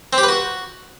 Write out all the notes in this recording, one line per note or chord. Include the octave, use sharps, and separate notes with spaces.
C4
G4
B4
F#4